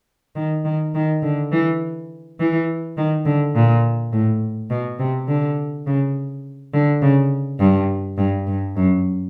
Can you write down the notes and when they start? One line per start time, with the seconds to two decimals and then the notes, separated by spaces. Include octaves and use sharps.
0.36 D#3
0.65 D#3
0.95 D#3
1.22 D3
1.51 E3
2.39 E3
2.97 D#3
3.25 D3
3.55 A#2
4.12 A2
4.70 B2
4.99 C3
5.28 D3
5.86 C#3
6.73 D3
7.01 C#3
7.60 G2
8.18 G2
8.47 G2
8.76 F#2